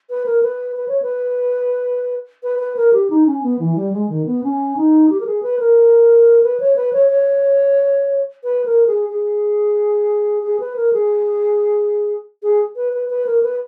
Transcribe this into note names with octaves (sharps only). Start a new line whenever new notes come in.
B4
A#4
B4
B4
C#5
B4
B4
B4
A#4
G4
D#4
C#4
B3
E3
G3
G#3
D#3
B3
C#4
D#4
G4
A#4
G#4
B4
A#4
B4
C#5
B4
C#5
C#5
B4
A#4
G#4
G#4
G#4
B4
A#4
G#4
G#4
B4
B4
B4
A#4
B4